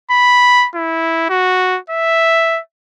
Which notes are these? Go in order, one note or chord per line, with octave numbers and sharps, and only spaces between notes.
B5
E4
F#4
E5